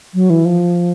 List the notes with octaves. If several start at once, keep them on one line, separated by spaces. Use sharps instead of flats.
F#3
E3
F3